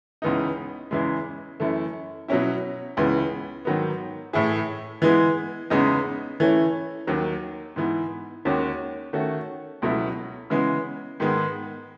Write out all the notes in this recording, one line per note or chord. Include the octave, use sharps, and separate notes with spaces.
C#2 C#3 E3 B3 D#4
E2 C#3 E3 G#3
F#2 E3 A3
B2 F#3 C#4 E4
C#2 C#3 E3 B3
G#2 D#3 F#3 B3
A2 E3 A3 E4 G#4
E3 G#3 B3
E2 C#3 G#3 B3 D#4
E3 A3 C#4
D#2 D#3 F#3
G#2 E3 B3
D#2 D#3 G#3 C#4 F#4
D#3 A3 C#4 F#4
C#2 B2 F#3 A3 E4
C#3 E3 G#3 B3
G#2 D#3 G#3 B3